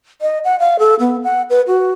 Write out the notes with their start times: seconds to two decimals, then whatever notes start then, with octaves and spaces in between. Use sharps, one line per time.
0.21 D#5
0.44 F#5
0.59 F5
0.79 A4
1.00 B3
1.24 F#5
1.50 B4
1.67 F#4